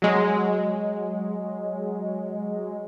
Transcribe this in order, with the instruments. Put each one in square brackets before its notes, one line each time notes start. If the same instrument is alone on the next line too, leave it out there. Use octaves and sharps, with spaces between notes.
[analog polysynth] F#3 G#3